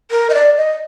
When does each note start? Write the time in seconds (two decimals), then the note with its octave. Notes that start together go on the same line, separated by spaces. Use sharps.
0.11 A#4
0.30 D#5
0.34 D5
0.57 D#5